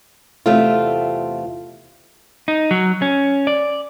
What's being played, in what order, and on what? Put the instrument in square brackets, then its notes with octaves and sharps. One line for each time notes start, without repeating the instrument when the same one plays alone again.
[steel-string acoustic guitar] E2 C3 A3 C4 F4
[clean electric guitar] D#4
F#3
C#4
D5